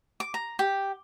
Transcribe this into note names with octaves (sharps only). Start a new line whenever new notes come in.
D6
A#5
G4